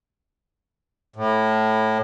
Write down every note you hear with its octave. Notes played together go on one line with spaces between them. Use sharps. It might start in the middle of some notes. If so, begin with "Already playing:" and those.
A2